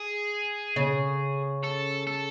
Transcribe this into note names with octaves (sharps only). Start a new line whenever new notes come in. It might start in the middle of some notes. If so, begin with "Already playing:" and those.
Already playing: G#4
C#3
A4
A4